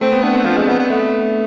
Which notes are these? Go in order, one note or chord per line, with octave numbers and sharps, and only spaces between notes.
A3 C4
B3
B3 D4
C4
F3
G#3
B3
B3
A3 B3